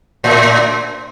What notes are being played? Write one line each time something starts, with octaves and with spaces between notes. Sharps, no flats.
A2